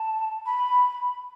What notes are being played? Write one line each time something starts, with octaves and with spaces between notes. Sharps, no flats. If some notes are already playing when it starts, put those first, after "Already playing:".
Already playing: A5
B5